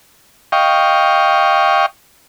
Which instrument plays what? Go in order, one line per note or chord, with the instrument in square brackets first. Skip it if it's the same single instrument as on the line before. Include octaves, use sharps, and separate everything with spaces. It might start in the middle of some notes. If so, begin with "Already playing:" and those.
[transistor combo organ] D#5 F5 G5 C#6